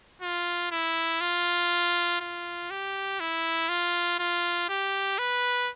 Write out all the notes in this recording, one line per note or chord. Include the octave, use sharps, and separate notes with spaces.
F4
E4
F4
F4
G4
E4
F4
F4
G4
B4